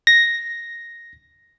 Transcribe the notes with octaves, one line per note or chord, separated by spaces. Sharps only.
A#6